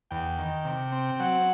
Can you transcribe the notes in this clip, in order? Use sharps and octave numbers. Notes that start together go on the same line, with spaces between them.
E2 G5
D#3
C3
C4
F#3 F#5